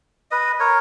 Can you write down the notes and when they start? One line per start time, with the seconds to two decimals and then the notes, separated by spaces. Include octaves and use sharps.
0.31 B4 D#5
0.60 A#4 C#5